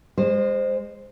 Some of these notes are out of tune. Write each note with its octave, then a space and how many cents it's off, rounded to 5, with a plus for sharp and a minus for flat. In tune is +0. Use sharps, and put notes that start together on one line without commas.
G#3 -30 C5 +0